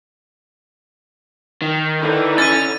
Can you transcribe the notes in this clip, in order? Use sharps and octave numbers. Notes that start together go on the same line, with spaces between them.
D#3
D3 E3 D#4
C#4 A6 D#7